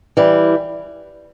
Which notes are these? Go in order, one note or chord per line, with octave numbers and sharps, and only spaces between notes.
E3 G3